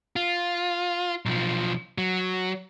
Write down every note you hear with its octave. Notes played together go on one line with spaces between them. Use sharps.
F4
B1 F3
F#3